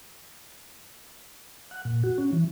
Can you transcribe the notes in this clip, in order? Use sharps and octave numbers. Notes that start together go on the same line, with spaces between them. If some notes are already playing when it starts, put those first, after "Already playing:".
F#5
A#2
F#4
C#4
E3